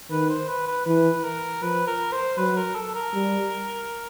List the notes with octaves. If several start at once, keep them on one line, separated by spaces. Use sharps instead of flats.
D#3 B4
C5
B4
B4
E3 B4
A#4
F3 B4
A#4
C5
F#3 B4
A#4
A4
A#4
G3